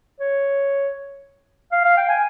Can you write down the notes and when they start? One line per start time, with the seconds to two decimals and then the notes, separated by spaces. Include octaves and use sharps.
0.20 C#5
1.72 F5
1.85 F5
1.97 G5
2.09 G#5